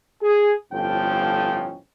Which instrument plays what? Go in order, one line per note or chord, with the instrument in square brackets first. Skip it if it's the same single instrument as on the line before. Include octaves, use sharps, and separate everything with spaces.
[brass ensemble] G#4
G1 F2 A2 F3 C#4 G5